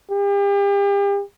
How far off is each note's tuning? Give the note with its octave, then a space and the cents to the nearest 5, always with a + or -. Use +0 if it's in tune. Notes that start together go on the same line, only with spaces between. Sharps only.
G4 +40